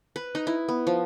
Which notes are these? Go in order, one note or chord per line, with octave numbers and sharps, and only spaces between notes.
B4
D#4
E4
B3
F3